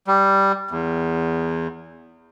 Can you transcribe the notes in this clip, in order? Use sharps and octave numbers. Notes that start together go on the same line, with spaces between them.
G3
E2